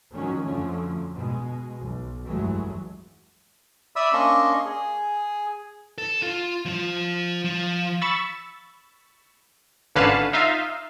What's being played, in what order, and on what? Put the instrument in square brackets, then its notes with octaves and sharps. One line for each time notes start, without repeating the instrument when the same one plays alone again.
[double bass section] D#3 F3 F#3 G#3 C#4
F2 D3 F3 F#3 A3 C#4
B2 G#3
B1
F1 G2 E3 F#3 G#3 A3
[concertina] D5 E5 B5 D#6 E6
A#3 C#4 D4 D#5 C6 C#6
G#4
[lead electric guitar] A4
F4
F3 F4
F3
[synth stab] B5 C#6 E6 A6
G#1 D3 C#4 B4 F5 A5
D#4 F4 E5 F5